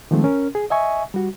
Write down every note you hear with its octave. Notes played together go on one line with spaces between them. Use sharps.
D#3 F3 G#3 A3 C4
C#4 A#4
G#4
D#5 E5 G#5 C#6
G3 F#4